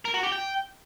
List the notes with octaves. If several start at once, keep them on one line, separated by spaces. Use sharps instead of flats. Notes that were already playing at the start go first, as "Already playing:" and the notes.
A#4
F#4
G4
G5